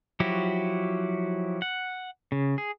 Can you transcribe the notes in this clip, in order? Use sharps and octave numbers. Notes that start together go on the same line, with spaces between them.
F3 F#3 E4 F#4 G4
F#5
C#3
G#4